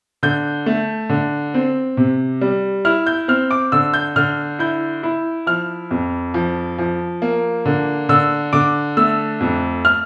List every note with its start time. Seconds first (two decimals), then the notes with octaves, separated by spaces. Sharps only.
0.23 D3 G6
0.66 A3
1.09 D3
1.54 C4
1.97 C3
2.41 G3
2.85 E4 F6
3.07 G6
3.28 C4 F6
3.51 D6
3.72 D3 E6
3.94 G6
4.16 D3 F6
4.59 E4 G6
5.03 E4
5.47 F3 F6
5.91 F2
6.34 F3
6.79 F3
7.22 A#3
7.65 D3
8.09 D3 E6
8.53 D3 D6
8.97 A3 E6
9.41 F2
9.85 F6